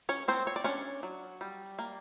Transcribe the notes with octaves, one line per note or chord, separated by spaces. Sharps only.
C#4 C#5
A#3 C4 C5
C#5
D5
C#4 D4 C#5
F#3
G3
A#3